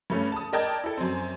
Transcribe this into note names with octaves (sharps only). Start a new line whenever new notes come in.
G2 A3 C#4
A5 D#6
A#4 D5 D#5 G5 A5 G#6
E4 A4
F#2 C4